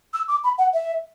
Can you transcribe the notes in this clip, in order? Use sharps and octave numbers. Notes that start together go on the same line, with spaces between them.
E6
D6
B5
F#5
E5